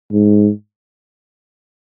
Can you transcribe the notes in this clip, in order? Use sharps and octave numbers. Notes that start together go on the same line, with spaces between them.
G#2